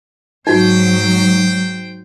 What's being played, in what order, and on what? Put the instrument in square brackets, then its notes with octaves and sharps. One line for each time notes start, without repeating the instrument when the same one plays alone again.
[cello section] G#2 F#3 [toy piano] D#4 F#4 [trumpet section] C5 G5